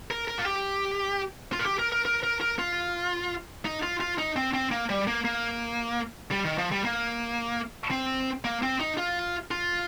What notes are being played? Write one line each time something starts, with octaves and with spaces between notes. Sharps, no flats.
A#4
A#4
F4
G4
F4
A#4
G4
A#4
A#4
A#4
A#4
A#4
F4
D#4
F4
F4
D#4
C4
C4
A#3
G3
A#3
A#3
G3
D#3
F3
G3
A#3
C4
A#3
C4
D#4
F4
F4